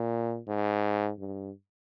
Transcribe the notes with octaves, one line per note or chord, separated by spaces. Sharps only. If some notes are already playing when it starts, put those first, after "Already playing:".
Already playing: A#2
G#2
G2